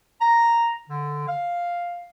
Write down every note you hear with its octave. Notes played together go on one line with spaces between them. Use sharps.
A#5
D3
F5